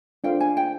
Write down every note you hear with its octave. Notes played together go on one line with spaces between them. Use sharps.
D4 F4 A4 C5 F5 G5
G#5
G5